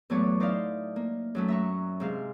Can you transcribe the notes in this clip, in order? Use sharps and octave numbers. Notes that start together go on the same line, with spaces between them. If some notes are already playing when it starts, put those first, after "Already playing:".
E2 A2 F#3 A3 C#5 D6
D#4 C5 D5 E5 F5
A#3
F#2 F#3 A3
E5 A#5 C#6
G#2 C3 F5